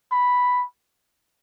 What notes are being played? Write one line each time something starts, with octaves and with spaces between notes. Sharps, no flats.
B5